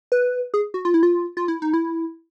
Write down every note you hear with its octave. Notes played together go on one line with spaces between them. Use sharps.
B4
G#4
F#4
F4
E4
F4
F4
E4
D#4
E4